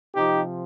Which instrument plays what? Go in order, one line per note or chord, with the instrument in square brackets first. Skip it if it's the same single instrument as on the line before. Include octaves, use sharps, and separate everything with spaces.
[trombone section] C3 F3 C4 D#4 G4